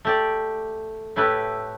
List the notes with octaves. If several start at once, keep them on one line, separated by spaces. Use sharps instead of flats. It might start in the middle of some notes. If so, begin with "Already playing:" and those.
A3 G4 D5
A2 A3 E4 G4 B4